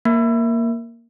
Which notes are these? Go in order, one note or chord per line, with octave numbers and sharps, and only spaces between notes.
A#3